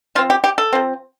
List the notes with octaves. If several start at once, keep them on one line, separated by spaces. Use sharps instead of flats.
F3 C4 F4
G4
G4
A4
F3 C4